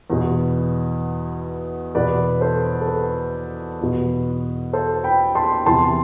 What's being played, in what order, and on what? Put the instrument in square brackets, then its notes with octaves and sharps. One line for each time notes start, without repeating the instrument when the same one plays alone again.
[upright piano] E2 B2
E2 B2 B4 D5
A4 C5
A4
B4
E2 B2
A4 C5
G5 B5
A5 C6
E2 C3 E3 A5 C6